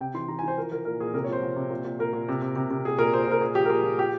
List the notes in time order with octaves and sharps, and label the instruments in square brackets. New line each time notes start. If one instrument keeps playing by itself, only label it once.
[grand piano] C3 G5
E3 C6
E3 A#5
G#5
E3 C5
F3 A#4
F3 A#4
A#2 A#4
A#2 G#4
C3 A#4
C#5
F3 C5
F3
C3
A#2
A#2
A#2 A#4
A#2
C3
C3
C3
C3
A#2 G#4
A#2 A#4
A#2 C5
C5
A#2 A#4
A#2 G#4
F3 G4
A#4
A#2 G#4
F3
F3 G4